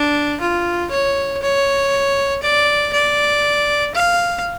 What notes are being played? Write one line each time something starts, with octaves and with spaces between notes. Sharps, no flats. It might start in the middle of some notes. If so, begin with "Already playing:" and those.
Already playing: D4
F4
C#5
C#5
D5
D5
F5